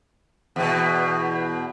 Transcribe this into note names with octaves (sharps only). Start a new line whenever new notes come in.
E2 B2